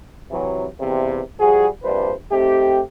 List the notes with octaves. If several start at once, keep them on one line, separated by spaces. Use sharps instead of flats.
C3 E3 F#3
E2 G2 C3
F3 G3 F#4 G#4
A#1 G2 C3 D4 B4 C5
A3 C4 D#4 G4